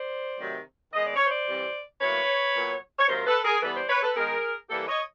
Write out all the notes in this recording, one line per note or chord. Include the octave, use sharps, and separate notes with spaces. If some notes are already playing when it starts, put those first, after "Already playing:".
Already playing: C5 D5
C3 D#3 F#3 A3 C4
D#3 G#3 B3 D#5
D5
C#5
C5 D5
E3 G3 C4
A2 F#3 A#3 B4 C#5
A#2 F#3 B3
C#5
C3 D#3 F#3 A#3 A#4 C5
A4 B4
G#4 A#4
E3 G3 B3 A4 B4
C5 D5
B4 C#5
A4 B4
D#3 G#3 B3 G#4 A#4
E3 G3 A#3 G4 A4
C#5 D#5